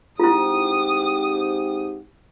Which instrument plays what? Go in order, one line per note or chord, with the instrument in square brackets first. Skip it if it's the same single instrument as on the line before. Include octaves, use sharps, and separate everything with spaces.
[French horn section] G#2 C4 G4 [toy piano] E4 F4 [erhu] D#6